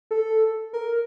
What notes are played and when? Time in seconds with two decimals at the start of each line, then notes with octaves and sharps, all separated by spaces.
0.11 A4
0.73 A#4